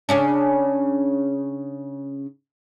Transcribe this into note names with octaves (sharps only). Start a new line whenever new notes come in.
C#3 C#4 D4